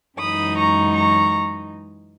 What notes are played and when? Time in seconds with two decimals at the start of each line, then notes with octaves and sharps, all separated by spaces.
0.17 F#2 E3 G#3 D#4 B5 D#6
0.56 A#5 C#6
0.95 A#5 C#6